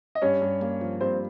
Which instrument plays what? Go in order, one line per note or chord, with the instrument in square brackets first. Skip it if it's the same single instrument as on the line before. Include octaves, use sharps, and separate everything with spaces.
[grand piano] D#5
[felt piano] G2 [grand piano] C#4 C#5
[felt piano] G2
A#3
F3
[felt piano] G2 [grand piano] C4 C5